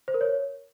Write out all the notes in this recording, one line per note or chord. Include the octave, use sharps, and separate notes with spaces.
C5
A#4
C#5